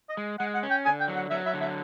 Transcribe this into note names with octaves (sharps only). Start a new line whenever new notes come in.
D#5
G#3
G#3 F#5
F#5
C#4
G5
D3 G#5
G5
F#3
F#5
F#3 E5
E5
D3
E5